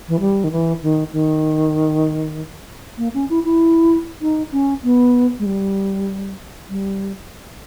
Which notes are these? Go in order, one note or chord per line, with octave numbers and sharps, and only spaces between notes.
E3
G3
D#3
E3
D#3
D#3
A#3
C#4
E4
E4
D#4
C#4
B3
G#3
G3
G3